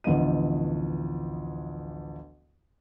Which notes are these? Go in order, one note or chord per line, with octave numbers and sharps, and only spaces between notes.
A1 D2 F3 B3 D#5 D#7